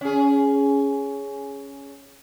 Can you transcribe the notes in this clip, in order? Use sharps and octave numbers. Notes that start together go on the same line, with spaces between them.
C#4 G#4